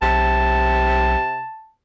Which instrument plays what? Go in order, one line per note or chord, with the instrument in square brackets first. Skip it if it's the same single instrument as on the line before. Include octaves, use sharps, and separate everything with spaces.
[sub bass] B1 [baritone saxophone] C3 [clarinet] A5